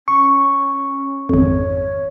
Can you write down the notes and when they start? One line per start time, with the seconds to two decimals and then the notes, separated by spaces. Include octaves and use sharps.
0.08 C#4 C#6
1.29 G#1 F2 C#5